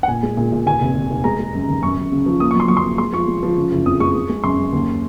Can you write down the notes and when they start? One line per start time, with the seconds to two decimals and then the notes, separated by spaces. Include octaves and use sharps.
0.03 F#5
0.08 A#2 G#5
0.23 G#3
0.37 A#2
0.52 A#2
0.66 D#2 G#5
0.81 F1
0.95 F1
1.10 F1
1.24 G#3 A#5
1.39 G#3
1.54 F#2
1.68 D#3
1.82 F#2 C#6
1.97 F#2
2.12 C#3
2.26 F3
2.40 A#3 D#6
2.51 C#6
2.55 F#3 C6
2.68 F#3 C#6
2.77 C6
2.85 A#3
2.98 G#3 C6
3.13 F3 C#6
3.28 G#3
3.43 F3
3.56 C#3
3.71 F#1
3.86 F2 D#6
4.00 G#3 C#6
4.14 G#3
4.29 G#3
4.44 F#2 C6
4.58 F#2
4.73 D#2